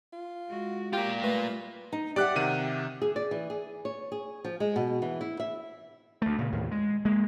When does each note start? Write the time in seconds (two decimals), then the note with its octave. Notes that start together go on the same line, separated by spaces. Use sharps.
0.13 F4
0.48 G#3 F#4
0.93 A#3 F4 G4
1.23 G3 A3 B4
1.92 D#4
2.16 G4 D5 E5 F#5 D6 F#6
2.36 C3 D#3 D#7
3.02 G#4
3.16 D5
3.31 E3
3.50 G#4
3.85 C#5
4.12 G#4
4.44 F3
4.60 G#3
4.76 B2
5.02 E3
5.21 E4
5.40 E5
6.22 D2 A3
6.38 A#2 C#3
6.52 D#2 A2
6.71 G#3
7.05 G#3 A#3